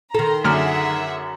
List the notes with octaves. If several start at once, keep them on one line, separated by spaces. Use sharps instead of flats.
D#3 A4 A#5 C6
F#2 D3 G#4 E5 F#5 F6